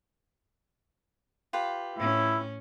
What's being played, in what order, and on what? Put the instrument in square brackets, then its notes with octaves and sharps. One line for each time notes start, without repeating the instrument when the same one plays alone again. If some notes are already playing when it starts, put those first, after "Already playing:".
[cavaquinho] F4 G4 B4
[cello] A2 C#4 [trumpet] E4